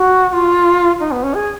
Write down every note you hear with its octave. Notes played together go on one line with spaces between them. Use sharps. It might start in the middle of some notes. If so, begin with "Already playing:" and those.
Already playing: F#4
F#4
F4
D#4
B3
C#4
G#4